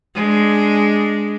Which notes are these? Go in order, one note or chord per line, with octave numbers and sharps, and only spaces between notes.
G#3 D4